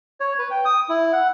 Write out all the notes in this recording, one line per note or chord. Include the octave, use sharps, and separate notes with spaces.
C#5
B4
G5
D#6
E4
F#5